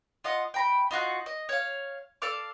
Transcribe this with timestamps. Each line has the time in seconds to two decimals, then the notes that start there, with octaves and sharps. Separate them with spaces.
0.24 F4 D#5 F#5
0.54 G5 A#5 B5
0.91 D#4 F4 F#4 F#5
1.26 D#5
1.49 C#5 F5
2.22 A4 D5 F5 D6